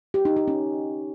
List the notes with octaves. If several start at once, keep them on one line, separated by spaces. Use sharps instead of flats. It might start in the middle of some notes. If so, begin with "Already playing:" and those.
G4
D#4
G4
C#4